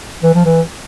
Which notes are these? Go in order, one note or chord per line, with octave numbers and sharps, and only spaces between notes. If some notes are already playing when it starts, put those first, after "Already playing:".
E3
F3
E3